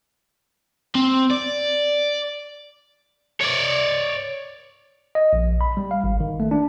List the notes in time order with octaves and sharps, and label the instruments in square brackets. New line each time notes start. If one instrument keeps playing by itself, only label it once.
[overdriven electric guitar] C4
D5
C#5 D5
[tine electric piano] D#5
A#1
B5
G3
F5
G#1
D#3
A3
D4